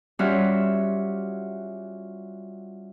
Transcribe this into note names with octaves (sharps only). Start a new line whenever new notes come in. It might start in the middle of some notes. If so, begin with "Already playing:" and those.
G3 C#4 F4 F#4 E5